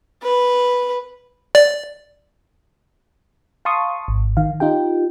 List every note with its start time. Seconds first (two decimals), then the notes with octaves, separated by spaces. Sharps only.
0.23 B4
1.55 D5
3.65 F5 A5 C6 C#6 D#6
4.08 G#1
4.37 D#3 F5
4.60 D#4 F4 G4 G5